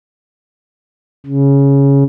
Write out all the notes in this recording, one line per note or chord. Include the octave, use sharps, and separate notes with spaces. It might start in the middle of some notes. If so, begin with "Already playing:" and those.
C#3